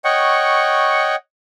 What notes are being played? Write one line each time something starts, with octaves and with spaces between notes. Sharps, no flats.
C#5 D#5 F#5 G5 C#6